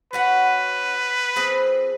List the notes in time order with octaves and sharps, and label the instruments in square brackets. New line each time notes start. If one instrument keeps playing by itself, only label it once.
[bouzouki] C#4 F#4 F#5 [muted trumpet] B4
[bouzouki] F3 C4 G#4